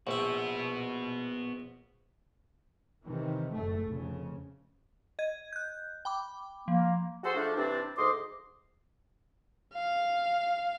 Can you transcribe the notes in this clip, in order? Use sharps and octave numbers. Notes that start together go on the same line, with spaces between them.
A#1 B3 F#4 E5
C3 D#3 E3
F#1 A2 A3
F1 F2 C#3
D#5 G#6
F#6 G6
G5 B5 D6
F3 A#3
F#4 G#4 A4 C5 F#5
F3 A3 D4
C3 E3 C4 D4
D2 G#2 D#5 C6 D6
F5